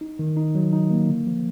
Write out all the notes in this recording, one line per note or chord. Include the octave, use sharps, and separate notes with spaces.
D#4
D#3
D#4
F#3
D#4
A#3
D3
F3